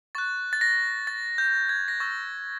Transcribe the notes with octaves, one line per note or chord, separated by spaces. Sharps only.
C#6 F#6 A6
A6
A#6
A6
G6
G#6
A#6
C#6 E6 G6 A6